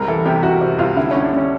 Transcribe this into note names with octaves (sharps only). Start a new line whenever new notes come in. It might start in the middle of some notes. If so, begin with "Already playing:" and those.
Already playing: C2 G#3 A#4
E3 A4
C3 G4
C3 F#4
C3
C2 F4
D3 E4
D3 C#4
D4
D3 C#4